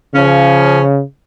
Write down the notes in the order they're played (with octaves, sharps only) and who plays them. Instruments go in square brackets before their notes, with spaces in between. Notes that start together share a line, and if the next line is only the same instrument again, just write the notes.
[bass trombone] C#3 [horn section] F3 C#4